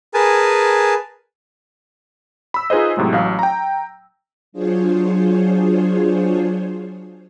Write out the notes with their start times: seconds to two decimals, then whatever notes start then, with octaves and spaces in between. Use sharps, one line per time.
0.14 G#4 A#4 B4 G#5 A5
2.54 B5 E6
2.70 D#4 F4 G#4 B4 C5 D#5
2.97 A2 C3 F#3 G#3
3.12 A1 F#3 F5
3.39 G5 A#5
4.52 F#3 D4 F4 G#4 C5 C#5